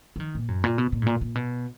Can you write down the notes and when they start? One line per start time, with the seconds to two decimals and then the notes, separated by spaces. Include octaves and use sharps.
0.16 F3
0.20 D#3
0.35 A#2
0.48 F#2
0.64 A#2
0.78 B2
0.92 A#2
1.02 G#2
1.06 A#2
1.21 A#2
1.35 B2